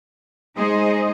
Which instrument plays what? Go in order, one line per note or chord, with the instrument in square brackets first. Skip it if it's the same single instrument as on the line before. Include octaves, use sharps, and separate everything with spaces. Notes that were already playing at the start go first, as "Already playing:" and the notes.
[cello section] G#3 D#4 G#4 C5 D#5